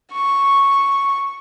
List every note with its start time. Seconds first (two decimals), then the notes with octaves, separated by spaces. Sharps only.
0.12 C#6